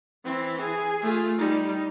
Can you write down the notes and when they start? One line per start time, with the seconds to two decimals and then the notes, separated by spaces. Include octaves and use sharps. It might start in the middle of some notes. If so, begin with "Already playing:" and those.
0.25 E3 C4
0.61 G#4
1.01 A3 F4
1.38 G3 D#4